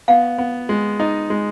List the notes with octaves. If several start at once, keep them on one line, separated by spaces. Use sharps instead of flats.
B3 F5
B3
G#3
D#4 D#5
G#3